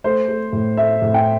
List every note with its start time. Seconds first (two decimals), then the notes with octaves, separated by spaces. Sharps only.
0.04 A3 C5
0.28 A3
0.53 A2
0.77 A3 E5
1.02 A2
1.14 G5